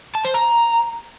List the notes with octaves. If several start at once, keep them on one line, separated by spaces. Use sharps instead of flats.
A5
C5
A#5